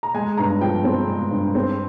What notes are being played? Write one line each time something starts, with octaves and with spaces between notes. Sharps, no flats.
A#5
G#3 G#5
G2 A#5
F3 G5
C4
G#3
G2
C4